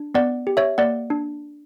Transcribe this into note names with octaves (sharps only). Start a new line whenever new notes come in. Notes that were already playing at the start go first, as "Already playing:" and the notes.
Already playing: D4
B3 D5 F#5
G4
C#5 E5
A#3 D5 F#5
D4